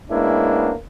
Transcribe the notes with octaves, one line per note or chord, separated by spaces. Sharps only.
G#3 A#3 B3 C#4 D4 E4